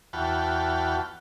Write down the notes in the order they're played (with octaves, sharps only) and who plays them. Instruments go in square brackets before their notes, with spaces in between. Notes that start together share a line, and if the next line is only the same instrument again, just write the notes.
[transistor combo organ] E2 F#4 G5 A5 B5 F6